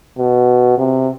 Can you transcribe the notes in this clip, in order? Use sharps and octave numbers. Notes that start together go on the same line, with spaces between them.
B2
C3